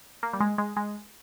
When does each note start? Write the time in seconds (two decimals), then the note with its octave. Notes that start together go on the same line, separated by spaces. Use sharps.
0.23 A#3
0.33 G3
0.40 G#3
0.58 G#3
0.77 G#3